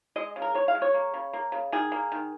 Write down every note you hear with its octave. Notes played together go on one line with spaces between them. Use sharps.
G#3 D#5
C#3
A#4
G#3 C#5
F5
G#3
C#5
A#3
C#3
A#3
C#3
D#3 G#4
A#3
D#3